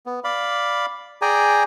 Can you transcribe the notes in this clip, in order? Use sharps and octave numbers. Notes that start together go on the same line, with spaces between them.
B3
D5 F5 B5
G#4 D5 G5 G#5 A#5